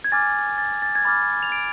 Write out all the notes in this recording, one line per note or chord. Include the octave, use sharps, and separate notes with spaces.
G#6
G#5 D6 F6 A6
A6
A6
G#6
B5 D6 F6 A6
F7
D7